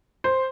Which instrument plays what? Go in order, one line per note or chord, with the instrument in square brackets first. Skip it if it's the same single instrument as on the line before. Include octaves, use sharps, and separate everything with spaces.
[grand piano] C5